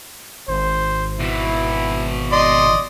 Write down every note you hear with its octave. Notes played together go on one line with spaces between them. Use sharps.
G#1 C5
B2 E3 E4
D5 D#5 C6